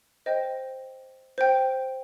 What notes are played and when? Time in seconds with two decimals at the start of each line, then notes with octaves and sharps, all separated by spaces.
0.26 C5 D#5 G5
1.38 C5 G5